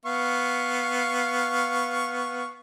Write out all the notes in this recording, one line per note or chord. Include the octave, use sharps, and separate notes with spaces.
B3 F5 C#6